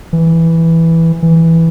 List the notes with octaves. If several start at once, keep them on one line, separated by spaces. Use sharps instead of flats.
E3
E3